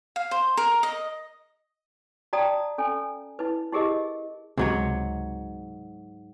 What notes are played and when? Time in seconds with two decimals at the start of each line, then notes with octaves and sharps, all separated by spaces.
0.16 F5
0.31 C5
0.57 A#4
0.83 D#5
2.33 F#4 D5 G5 A5 A#5 D#6
2.78 C#4 A4 G#5
3.39 E4 B4
3.72 E4 G4 G#4 A#4 D#5
4.58 C#2 G#2 C3 F#3 C#5